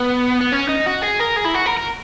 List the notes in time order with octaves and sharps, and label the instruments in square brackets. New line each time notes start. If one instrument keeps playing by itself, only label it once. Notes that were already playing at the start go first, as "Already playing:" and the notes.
Already playing: [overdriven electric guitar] B3
B3
C#4
D#4
F#4
G#4
A#4
G#4
E4
F#4
A#4
A#4